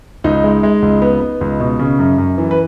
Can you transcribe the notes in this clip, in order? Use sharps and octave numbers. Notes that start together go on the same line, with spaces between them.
C#2 D#4
G#3
G#3
C#2
B3
B3
C#2
B2
C#3
F#2
F#2
E3
B4